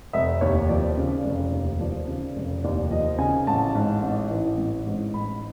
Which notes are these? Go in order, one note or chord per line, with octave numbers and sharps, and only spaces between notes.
F1 E5
D#2 C#5
F3 D5
C#3
F1
D#2
F3 D5
C#3
F1
D#2 D5
F3 D#5
C#3 G#5
A1 A5
G#2
A1
E3
A1
G#2
A1 B5